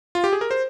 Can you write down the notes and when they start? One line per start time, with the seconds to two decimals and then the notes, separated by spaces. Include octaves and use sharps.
0.15 F4
0.24 G4
0.33 G#4
0.41 A#4
0.51 C5